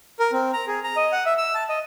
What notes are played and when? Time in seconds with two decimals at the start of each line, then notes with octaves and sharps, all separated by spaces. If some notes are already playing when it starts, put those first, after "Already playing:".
0.19 A#4
0.32 C4
0.53 A#5
0.67 G#4
0.84 A#5
0.96 D#5
1.12 F#5
1.26 E5
1.38 E6
1.55 A5
1.69 D#5